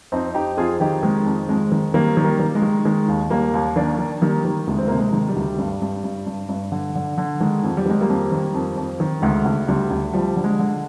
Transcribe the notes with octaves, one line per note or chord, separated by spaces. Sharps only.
F2 C4 D#4
F2 D#4 G4
F2 F4 G#4
D#3 D#4 G4
D#3 G#3
F2
F2 G#3
D#3
D#3 G3 A#3
D#3
G3 A#3
D#3
G#3
D#3
D#3 G#3
D#2
D#2 G3 A#3
D#2
D#3 A#3 D4
D#3
D#3 G3 A#3
D#3
D2 G#3
C4
C3 A#3
G#3
D#3
G3
D2
G2
G2
G2
G2
G2
D3
D3
D3
D#3 G#3
F2
G3
D#3 G#3
G3 A#3
F2
D#3
F2
F2
D#3
D2 G#3
D2
D2 G3
D2
F3 G3
D3
G#3
D3